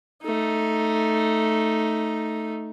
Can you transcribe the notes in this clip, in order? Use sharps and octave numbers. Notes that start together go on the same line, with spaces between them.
A3 D#4